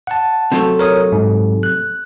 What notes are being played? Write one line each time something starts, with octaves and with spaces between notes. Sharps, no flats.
F#5 A5
C3 F#3 A3
A#4 C#5 D#6
G#2
F#6